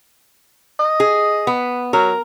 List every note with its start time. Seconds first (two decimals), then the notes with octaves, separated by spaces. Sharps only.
0.79 D#5
1.00 G#4
1.47 B3
1.93 F#3 A#4